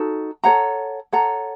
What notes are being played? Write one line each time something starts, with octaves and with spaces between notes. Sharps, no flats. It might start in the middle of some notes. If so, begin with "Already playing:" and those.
Already playing: D#4 F#4 A4
A4 C#5 F#5 A#5
A4 C#5 F#5 A#5